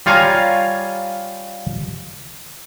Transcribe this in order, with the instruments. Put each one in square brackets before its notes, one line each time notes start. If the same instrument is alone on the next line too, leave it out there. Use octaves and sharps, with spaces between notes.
[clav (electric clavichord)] G3 F4 C#5 F5 G#5 A#5